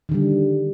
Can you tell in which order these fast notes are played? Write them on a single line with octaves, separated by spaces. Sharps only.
D#3 D3 G3